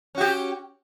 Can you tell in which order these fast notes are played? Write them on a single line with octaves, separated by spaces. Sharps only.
C#4 F#4 G4